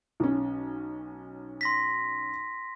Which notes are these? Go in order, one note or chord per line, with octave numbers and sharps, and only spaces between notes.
B1 C#4
C6 A#6 B6